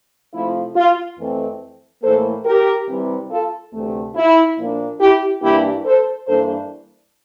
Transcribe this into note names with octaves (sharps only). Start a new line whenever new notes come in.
C3 F3 A3 E4
F4
F2 E3 A3 C4
A2 E3 A#3 A4 C5
G4 A#4
C3 E3 G3
F4 A4
D2 C3 E3 A3
E4
A#2 F3 A#3 D4
E4 G4
G2 E3 A#3 D4 E4 G4
A4 C5
G2 E3 A#3 D4 A4 C5